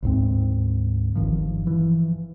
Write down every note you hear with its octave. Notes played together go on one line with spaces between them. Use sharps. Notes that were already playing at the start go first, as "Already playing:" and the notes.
D2 G#2 C4
G1 G2 D#3 F3
E3 F3